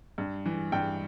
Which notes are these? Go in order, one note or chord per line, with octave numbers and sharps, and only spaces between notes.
G2
E3
G2 G5